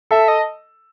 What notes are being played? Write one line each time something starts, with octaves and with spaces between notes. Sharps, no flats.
A4 E5
D#5